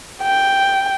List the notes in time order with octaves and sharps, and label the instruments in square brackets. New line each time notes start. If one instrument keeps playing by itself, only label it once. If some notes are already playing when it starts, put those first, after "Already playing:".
[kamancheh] G5